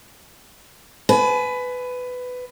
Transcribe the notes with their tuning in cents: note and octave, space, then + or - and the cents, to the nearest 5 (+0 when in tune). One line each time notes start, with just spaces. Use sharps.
B4 +15 G#5 +35